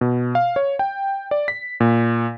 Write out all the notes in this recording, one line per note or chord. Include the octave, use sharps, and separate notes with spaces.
B2
F5
C#5
G5
D5
B6
A#2